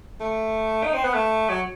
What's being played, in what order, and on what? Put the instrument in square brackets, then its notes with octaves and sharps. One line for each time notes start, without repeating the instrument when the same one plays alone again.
[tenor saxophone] A3
D#4
C4
B3
A3
F#3